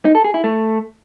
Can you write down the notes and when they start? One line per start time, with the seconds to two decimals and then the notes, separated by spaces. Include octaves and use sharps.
0.05 D#4
0.15 A4
0.24 G#4
0.34 E4
0.44 A3